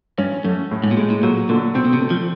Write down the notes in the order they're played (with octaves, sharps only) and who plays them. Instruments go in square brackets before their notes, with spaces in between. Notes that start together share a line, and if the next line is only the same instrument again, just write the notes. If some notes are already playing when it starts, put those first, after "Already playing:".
[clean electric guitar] G2 [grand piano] C#4
[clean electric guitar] F#2 [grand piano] A3
[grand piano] A2
[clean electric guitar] G#2
A#2
[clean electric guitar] A2 [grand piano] G#3
[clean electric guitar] A2
[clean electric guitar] A#2 [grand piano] F#3
[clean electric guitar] A#2 [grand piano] D3
[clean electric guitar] B2 [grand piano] C4
[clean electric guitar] B2
C3
[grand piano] A3
[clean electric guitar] F3